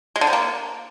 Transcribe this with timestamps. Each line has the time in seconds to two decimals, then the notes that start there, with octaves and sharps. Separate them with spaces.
0.16 G#3
0.21 D3
0.27 C3
0.33 A#3